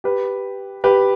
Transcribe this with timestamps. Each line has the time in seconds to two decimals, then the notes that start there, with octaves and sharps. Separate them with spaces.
0.04 G4 B4
0.84 G4 B4